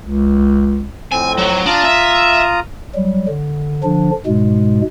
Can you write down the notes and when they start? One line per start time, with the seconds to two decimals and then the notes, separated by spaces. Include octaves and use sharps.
0.03 C#2
1.12 F2 A2 C4 G#5
1.37 F#3
1.66 D4 F4 A#5 D#6
1.84 E5
2.95 F#3 G3
3.28 D3
3.84 D3 F3 D4
4.26 G#2 B2 G#3